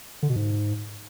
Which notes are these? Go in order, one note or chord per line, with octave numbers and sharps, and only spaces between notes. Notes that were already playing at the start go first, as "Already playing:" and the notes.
D3
B2
G#2